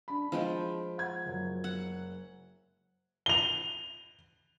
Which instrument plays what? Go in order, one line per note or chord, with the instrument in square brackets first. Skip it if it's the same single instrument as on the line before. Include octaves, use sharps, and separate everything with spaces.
[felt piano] D4 B5
[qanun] F3 G#3 G5
[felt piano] F#5 G#6
F#1 F#3
[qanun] F#5
[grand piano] F7 G7